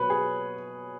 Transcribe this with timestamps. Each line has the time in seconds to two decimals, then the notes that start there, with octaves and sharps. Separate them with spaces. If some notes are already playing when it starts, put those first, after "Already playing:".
Already playing: B2 F#3 B4 C#5
0.10 G#4